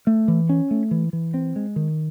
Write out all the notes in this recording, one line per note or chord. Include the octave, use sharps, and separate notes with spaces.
A3
E3
C#4
A3
E3
E3
C4
G#3
D#3